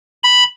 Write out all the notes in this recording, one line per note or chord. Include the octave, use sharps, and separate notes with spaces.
B5